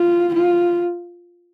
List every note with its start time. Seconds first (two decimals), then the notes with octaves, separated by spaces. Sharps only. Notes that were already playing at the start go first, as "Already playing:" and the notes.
Already playing: F4
0.35 F4